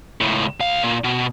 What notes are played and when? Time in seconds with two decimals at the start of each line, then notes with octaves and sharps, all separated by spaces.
0.21 C#2 A2
0.60 C#2 F5
0.84 A#2
1.04 B2